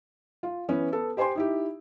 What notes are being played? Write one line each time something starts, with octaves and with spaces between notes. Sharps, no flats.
F4
E3 B3 C#4
B3 A4
G4 C5 G5 G#5 C6
D#4 E4 G4